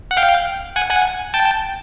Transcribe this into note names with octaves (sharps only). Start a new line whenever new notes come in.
F#5
F5 G5
F#5 G#5
F#5 G#5
G5 A5